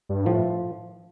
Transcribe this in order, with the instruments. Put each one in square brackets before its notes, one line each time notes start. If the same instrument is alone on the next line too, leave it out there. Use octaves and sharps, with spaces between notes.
[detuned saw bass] G2
[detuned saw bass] A2 [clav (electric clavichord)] F3